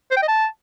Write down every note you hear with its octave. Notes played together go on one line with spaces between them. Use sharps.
C5
G5
D#5
A5